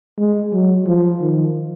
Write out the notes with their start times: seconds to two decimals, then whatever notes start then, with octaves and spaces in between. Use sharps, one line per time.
0.18 G#3
0.53 F#3
0.87 F3
1.21 D#3